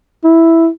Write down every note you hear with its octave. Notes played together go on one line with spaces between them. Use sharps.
E4